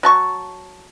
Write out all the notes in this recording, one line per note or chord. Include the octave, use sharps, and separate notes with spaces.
F#3 A5 C#6